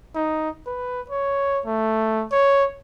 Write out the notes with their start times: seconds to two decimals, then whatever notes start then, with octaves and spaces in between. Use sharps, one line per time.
0.15 D#4
0.66 B4
1.10 C#5
1.66 A3
2.32 C#5